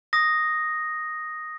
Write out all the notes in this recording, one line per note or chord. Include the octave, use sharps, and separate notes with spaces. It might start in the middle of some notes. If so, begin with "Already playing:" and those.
D#6 A#6